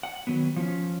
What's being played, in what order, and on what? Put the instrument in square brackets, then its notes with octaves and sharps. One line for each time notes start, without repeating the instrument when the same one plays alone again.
[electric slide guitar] F#5
D#3 F#3 B3
F3 C#4